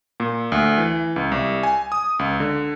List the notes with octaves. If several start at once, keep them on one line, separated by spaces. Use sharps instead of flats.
A#2
D2
E3
C#2
C2
G#5
D#6
C#2
D3